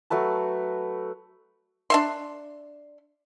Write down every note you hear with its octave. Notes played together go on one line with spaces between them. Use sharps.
F#3 A3 B4 A5
D4 E5 C6